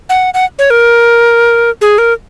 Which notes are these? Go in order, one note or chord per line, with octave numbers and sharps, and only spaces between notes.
F#5
F#5
C#5
A#4
G#4
A#4